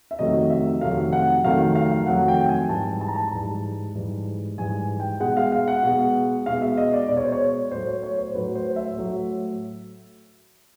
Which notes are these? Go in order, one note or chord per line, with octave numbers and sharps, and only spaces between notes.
E5
F2 C3 D#3 F#3 A3 D#5
E5
F2 C3 D#3 F#3 A3 F5
F#5
F2 C3 D#3 F#3 A3 F5
F5
F2 C3 D#3 F#3 A3 F#5
G5
G5
G#5
G#2 E3 G3 A5
A5
A#5
A5
G#2 E3 G3
G#2 E3 G3
G#2 E3 G3 G#5
G5
B2 G#3 F#5
F5
F5
F#5
B2 G#3
B2 G#3 F5
E5
D#5
D5
B2 G#3 D5
C#5
C5
C#5
A2 F#3 A3 C5
C#5
C#5
C5
A2 F#3 A3 B4
C5
E5
A2 F#3 A3